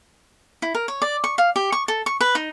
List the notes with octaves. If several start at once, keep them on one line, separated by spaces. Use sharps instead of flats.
E4
A#4
C#5
D5
C#6
F5
G4
C#6
A4
C#6
B4
D#4